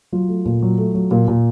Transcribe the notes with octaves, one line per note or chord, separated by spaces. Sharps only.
F#3 F4
A3
A#2
F#3
A3
F#3
A#2
A#2